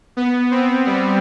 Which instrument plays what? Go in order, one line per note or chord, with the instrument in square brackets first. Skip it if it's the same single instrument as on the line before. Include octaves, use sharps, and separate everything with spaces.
[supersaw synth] B3
C4
G3